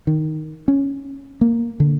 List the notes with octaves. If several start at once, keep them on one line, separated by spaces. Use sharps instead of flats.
D#3
C#4
A#3
D3